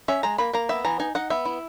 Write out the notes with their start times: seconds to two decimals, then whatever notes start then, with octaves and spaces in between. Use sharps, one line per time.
0.08 C#4 E5
0.23 G#3 A#5
0.38 A#3 B5
0.53 A#3 A#5
0.69 B3 E5
0.85 E3 A#5
1.00 D#4 G#5
1.15 D#4 F#5
1.30 B3 E5
1.45 E4